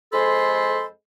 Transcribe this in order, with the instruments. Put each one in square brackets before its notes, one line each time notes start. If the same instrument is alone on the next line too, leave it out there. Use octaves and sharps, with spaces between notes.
[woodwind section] F2 G#3 A4 C5 B5 C6